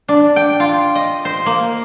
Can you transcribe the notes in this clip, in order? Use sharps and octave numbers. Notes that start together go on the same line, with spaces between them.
D4
G5
F4
D#5
C5
A#3